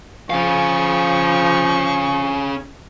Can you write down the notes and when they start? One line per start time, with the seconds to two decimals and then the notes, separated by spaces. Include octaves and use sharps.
0.30 F3 C#4 F5 G#5 C#6